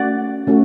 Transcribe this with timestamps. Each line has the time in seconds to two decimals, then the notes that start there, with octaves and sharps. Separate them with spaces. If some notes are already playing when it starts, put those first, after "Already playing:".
Already playing: A3 C#4 F#4 D5 F#5
0.47 A3 C#4 F#4